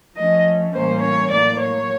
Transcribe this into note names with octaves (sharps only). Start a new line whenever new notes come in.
F3 A3 C#4 D#5
A2 E3 G3 A#3 C#4 C5
C#5
A2 F#3 A#3 D5
C#5